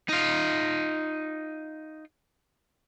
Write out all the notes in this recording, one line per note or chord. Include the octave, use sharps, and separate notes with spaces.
D#4 F4